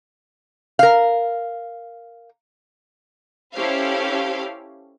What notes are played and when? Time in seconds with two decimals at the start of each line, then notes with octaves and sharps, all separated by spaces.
0.79 A#4 F5
3.54 C#4 E4 G4 A4 C5 F5